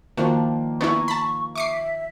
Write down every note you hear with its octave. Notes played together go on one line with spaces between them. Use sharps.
D#3 F3 A#3 D4 F#4
B3 D4 E4 G#5 A#5 C#6
A5 B5
E5 C#6 D6 C7